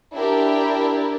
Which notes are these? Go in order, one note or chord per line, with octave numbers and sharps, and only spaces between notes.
D4 E4 G4 A#4